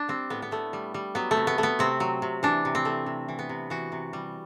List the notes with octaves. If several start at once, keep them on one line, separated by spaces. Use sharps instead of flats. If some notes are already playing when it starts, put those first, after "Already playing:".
Already playing: D4
G3 C4
A2 B3
B3
A2 A3
G3
G3
F#3 B3
A3
C3
B3
A3
B3
C3 C4
F#3
C3
E3 D4
C3
C4
A3
C3
E3
B3
C3
E3 F#4
C3
G3